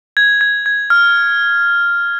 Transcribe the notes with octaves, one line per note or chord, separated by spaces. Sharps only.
G#6
G#6
G#6
F6